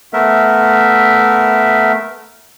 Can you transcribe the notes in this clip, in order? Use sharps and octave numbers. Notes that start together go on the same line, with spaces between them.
A3 B3 A#4 E5